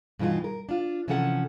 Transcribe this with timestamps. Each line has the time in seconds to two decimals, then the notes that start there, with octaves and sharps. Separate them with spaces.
0.19 G2 B2 E3 D#4 F4
0.44 A#4
0.69 D4 F4
1.08 C3 E3 F3 C#4 A4 F#5